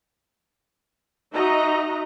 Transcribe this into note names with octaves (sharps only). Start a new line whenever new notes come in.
D#4 F#4 D#5 E5 A#5